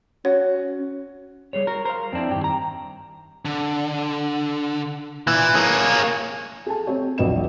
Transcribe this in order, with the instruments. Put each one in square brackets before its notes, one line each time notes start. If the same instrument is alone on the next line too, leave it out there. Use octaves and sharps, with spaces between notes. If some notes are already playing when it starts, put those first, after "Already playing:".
[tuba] C#4 [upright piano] F#4 [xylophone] C#5
[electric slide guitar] G3 G#4 C#5
[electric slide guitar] F#4 [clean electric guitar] A#4
[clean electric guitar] A#4 [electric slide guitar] C5 F5
[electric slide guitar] F2 E4 [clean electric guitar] C4 D4
[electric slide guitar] G2 D#3 [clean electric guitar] G4
[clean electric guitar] A#5
[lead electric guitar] D3
[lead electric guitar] A#2 [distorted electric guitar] E3
[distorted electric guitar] A#3 G#4 [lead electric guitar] C#5
[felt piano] G#4 A4 G#5 A5
C4 G4 C#5
E1 A#1 F#3 B4 D#5 E7